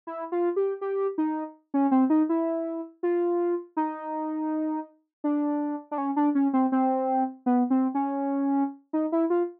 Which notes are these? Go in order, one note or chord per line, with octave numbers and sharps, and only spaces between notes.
E4
F4
G4
G4
D#4
C#4
C4
D#4
E4
F4
D#4
D4
D4
C#4
D4
C#4
C4
C4
B3
C4
C#4
D#4
E4
F4